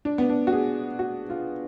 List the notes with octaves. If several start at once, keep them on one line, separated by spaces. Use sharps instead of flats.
D4
B3
D4
F#4
G#4
F#4
F4